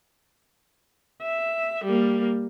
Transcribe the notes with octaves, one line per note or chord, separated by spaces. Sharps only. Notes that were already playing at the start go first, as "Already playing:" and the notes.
E5
G3 A#3